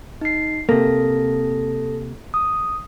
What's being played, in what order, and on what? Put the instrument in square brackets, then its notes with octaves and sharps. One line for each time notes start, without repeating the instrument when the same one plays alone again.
[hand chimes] D#4 C7
[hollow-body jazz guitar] C3 A#3 [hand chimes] A4 A#6
[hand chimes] D#6